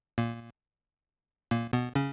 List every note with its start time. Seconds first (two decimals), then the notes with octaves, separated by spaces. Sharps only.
0.18 A#2 A#3
1.51 A#2 A#3
1.73 B2 B3
1.95 C#3 C#4